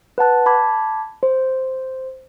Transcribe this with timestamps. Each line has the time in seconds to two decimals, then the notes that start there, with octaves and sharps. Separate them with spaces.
0.18 B4 F#5 A5 F#6
0.46 A5 B5 D6 G#6
1.23 C5